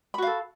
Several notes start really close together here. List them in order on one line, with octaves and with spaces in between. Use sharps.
B5 F#4 F5 A4